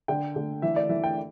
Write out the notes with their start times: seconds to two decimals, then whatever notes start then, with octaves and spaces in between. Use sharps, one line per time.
0.08 D3 G5
0.36 D3
0.62 E3 E5
0.76 D5
0.89 E3 E5
1.04 G5